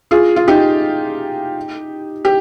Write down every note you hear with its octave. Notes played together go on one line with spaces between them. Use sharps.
F4 G#4
F4
D#4 G4
G4